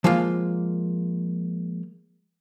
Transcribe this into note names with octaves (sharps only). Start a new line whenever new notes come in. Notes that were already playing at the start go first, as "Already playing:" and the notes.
F3 G#3 A#3 F4